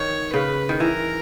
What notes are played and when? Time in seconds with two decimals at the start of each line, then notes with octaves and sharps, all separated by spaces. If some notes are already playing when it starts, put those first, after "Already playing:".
Already playing: D#3 C#5
0.33 C#3 B4
0.69 D#3
0.80 E3 A#4